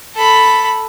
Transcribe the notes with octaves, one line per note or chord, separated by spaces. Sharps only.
A4 B5